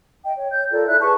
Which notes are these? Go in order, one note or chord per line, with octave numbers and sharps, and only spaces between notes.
D#5 G5
C#5
C#5 G6
F4 A4 A#4 D5
E4 E5 F#6
G#4 B4 A5 C#6